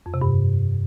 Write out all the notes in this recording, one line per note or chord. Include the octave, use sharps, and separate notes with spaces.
F2
C3
G2